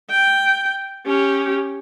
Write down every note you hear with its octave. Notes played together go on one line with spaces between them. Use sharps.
G5
C#4 G4